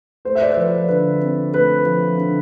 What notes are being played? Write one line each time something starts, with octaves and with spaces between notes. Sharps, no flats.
A3 C5
E5
D5
C5
F3 B4
D3 B4
C4
A3 B4
F3
D3